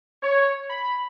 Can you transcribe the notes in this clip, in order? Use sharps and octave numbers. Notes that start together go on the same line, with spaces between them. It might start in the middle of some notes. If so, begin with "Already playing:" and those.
C#5
B5